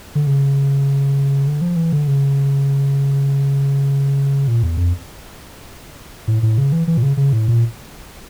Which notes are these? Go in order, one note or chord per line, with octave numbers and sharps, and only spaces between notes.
D3
C#3
D3
F3
E3
D3
C#3
A#2
E2
F2
A2
A2
C#3
E3
E3
A#2
C#3
C#3
A2
A#2